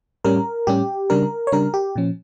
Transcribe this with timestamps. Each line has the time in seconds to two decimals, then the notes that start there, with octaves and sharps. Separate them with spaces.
0.24 A2 G3 C#4 A#4
0.67 A2 G3 C#4 G4
1.10 C#3 G3 D4 A#4
1.47 C#5
1.52 C#3 G3 D4 A#4
1.74 G4
1.96 A#2 F3 C#4